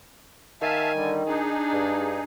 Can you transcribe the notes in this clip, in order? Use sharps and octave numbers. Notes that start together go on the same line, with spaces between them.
D#3 E5 F5 G#5 A5
D3 G3
D4 D#4 G#4
G2